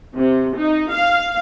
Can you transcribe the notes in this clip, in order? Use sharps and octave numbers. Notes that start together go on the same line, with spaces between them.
C3
D#4
F5